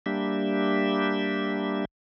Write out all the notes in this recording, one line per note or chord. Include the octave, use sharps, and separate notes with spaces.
G3 A#3 D4 G4 E5